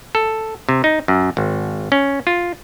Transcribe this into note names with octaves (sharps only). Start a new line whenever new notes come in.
A4
C3
D#4
F#2
G#1
C#4
F4